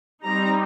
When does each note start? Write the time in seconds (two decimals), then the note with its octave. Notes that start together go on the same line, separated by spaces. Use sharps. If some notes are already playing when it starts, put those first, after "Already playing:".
0.24 G3 C4 D#4 A#5